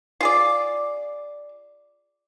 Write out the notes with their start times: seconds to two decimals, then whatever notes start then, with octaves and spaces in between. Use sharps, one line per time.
0.21 F4 G#4 D5